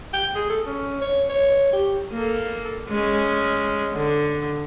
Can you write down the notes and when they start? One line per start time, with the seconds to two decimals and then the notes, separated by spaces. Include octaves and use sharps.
0.14 G5
0.35 G#4
0.50 A4
0.67 C#4
1.02 C#5
1.29 C#5
1.73 G4
2.12 A#3 A4
2.89 G#3 C#4
3.93 D3